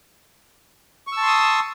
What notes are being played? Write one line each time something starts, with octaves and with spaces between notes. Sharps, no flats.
A5 C6 C#6 D#6 E6